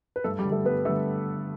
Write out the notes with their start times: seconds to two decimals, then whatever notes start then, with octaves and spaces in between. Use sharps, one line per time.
0.16 B4
0.24 G2 A3 A4
0.39 G3 G4
0.45 D3
0.50 G3 A3 A4
0.65 G2 B3 B4
0.85 D3 G3 A3 A4